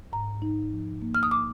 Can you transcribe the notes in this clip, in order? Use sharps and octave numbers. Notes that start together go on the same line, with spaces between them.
G#2 A#5
D#4
F3
A#3
F6
D#6
D6